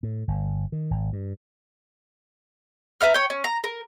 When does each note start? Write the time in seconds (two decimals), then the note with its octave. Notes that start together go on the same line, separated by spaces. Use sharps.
0.03 A2
0.28 G1
0.72 D#3
0.91 G#1
1.13 G2
3.01 B4 E5 A#5 F6
3.14 C#5 G5
3.30 C#4
3.44 A#5
3.64 A#4